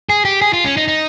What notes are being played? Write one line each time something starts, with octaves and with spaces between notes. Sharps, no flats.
G#4
G4
G#4
F4
C#4
D#4
D#4